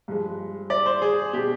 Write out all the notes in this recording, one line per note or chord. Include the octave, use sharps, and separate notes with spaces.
G2 F3 G#3
D5
C5
G#4
B2 G#3 G4